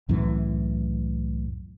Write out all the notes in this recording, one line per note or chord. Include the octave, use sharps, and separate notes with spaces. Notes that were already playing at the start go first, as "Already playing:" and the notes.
C2 F#2 A2 E3